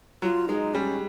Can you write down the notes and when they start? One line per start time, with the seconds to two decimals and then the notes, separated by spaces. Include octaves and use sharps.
0.22 F#3 F4
0.48 G#3 D#4
0.74 G3 C#4